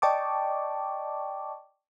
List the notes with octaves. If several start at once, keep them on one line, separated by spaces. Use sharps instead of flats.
D5 D#5 G5 A5 C#6 D6